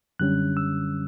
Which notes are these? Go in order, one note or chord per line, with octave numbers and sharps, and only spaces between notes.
F#2 D3 G3 C#4 F#6
E6